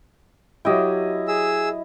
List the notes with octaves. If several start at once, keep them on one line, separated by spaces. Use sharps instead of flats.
F#3 E4 G4 D#5 G5
G#4 E6